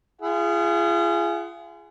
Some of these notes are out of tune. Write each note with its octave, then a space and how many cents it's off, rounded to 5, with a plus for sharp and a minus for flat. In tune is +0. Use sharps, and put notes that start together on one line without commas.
F4 -40 G#4 +0 F#5 +30